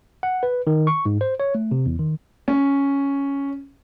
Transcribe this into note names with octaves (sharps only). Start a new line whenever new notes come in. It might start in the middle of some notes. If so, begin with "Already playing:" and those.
F#5
B4
D#3
C#6
G#2
C5
C#5
A3
C3
E2
D#3
C#4